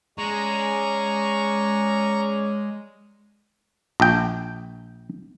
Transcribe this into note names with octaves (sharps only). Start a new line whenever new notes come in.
G#3 C#4 G#4 D5 A#5 C#6
A#1 G5